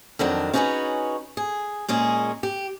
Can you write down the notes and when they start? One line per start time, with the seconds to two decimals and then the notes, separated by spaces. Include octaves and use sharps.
0.19 F2 D#3 F#3 D4
0.54 C#4 D#4 F#4 G#4 B4 C#5
1.37 G#4
1.88 A#2 G#3 C#4 G#4
2.43 G4